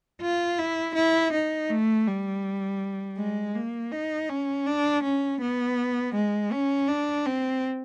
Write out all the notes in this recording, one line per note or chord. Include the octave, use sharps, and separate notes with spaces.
F4
E4
E4
D#4
A3
G3
G#3
A#3
D#4
C#4
D4
C#4
B3
G#3
C#4
D4
C4